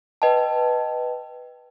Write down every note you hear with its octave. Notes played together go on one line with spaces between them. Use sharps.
B4 D#5 G5 A5